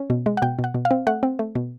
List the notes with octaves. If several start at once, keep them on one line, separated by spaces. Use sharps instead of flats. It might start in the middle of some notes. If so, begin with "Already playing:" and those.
Already playing: C#4
B2
G#3
F#5
B2 G5
B2
F#5
B2
F5
C4
A3 F#5
C4
A3
B2